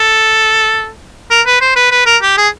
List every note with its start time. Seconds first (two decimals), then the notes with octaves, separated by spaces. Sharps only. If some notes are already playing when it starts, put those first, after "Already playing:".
Already playing: A4
1.31 A#4
1.47 B4
1.61 C5
1.76 B4
1.92 B4
2.06 A#4
2.23 G4
2.38 G#4